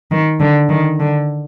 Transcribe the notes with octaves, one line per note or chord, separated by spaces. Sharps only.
D#3
D3
D#3
D3